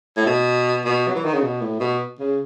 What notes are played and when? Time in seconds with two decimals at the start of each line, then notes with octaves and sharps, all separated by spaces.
0.17 A2
0.26 B2
0.85 B2
1.08 F#3
1.15 E3
1.25 D#3
1.34 C#3
1.42 B2
1.62 A2
1.80 B2
2.20 C#3